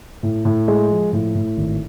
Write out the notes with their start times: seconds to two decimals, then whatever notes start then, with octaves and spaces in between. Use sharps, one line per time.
0.23 A2
0.45 A2
0.68 G#3
0.91 F3
1.13 A2
1.35 A2
1.57 G#1